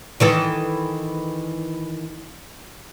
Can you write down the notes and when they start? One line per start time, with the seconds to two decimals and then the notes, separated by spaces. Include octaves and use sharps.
0.20 D#3 E3 A4